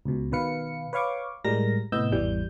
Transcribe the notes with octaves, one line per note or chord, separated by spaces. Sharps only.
C#2 B2
B2 D#3 B4 F5 C#7
B4 C#5 F5 C#6 D6
A2 G3 G#3 A#4 A#6
A2 C3 B3 D#5 E6 G6
G#1 E2 E3 G3 G6